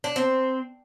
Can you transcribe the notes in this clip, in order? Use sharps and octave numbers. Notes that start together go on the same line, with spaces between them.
D4
C4